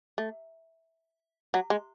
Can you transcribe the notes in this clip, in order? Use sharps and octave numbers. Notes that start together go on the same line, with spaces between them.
A3
F#3
G#3